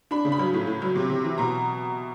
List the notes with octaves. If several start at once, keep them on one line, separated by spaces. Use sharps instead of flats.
D4 B5
C#3
B5
F#3
A2
A2
F#3
C3
C3
E3
B2 A#5